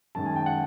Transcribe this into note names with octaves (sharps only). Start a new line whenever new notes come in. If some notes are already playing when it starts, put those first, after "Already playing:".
F#2 D#3 G#3 A5
G#5
G5
F#5